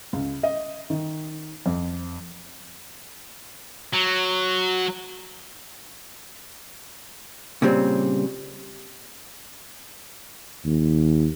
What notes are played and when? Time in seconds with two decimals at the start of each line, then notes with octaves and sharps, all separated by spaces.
0.13 C#2
0.43 D#5
0.90 D#3
1.66 F2
3.94 F#3
7.62 A#2 C#3 G3 C4
10.66 D#2